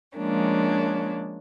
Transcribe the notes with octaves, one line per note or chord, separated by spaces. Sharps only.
F3 G#3 A#3 C#4 D4